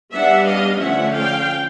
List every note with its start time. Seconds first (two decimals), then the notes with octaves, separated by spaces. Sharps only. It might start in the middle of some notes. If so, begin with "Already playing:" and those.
0.13 G3 B3 D4 E5 F#5
0.46 D#5 F5
0.80 D3 F3 A3 C#4 E5 F#5
1.14 F5 G5